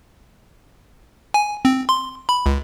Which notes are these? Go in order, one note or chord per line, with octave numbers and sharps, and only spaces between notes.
G#5
C4
C6
B5
C#2